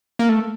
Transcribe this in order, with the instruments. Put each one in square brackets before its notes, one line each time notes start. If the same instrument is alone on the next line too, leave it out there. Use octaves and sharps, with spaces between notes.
[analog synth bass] A#3
A3